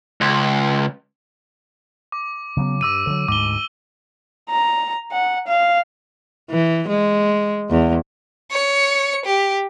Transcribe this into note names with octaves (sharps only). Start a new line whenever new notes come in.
C#2
D6
C#3 F#3 B3
G2 D6 E6 D#7
D3 F#3
D2 G#2 D6 G7
A#5
F#5
F5
E3
G#3
E2
C#5 C#7
G4